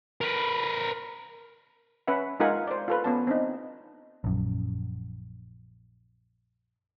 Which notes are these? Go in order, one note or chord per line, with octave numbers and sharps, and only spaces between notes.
A#4 B4
C#4 B4 E5 F#5
G#3 D#4 F4 A#4 F#5 G#5
C5 D5
F4 A4 B4
B3 C#4 A5
C4 D4 D#4
A#1 F#2